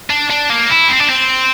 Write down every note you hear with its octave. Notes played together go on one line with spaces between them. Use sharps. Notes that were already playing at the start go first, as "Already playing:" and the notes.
D4
D4
A#3
E4
C4
D4
C4